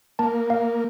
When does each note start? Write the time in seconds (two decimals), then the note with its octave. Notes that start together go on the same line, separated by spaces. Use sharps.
0.19 A#3 A5
0.50 F5